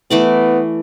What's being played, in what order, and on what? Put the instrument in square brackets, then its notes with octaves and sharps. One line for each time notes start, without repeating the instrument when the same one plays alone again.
[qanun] E3 A3 D5 [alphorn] B3